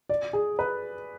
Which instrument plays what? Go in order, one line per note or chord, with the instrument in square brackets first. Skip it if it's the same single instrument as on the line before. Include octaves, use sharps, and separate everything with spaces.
[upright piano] D5
G#4
B4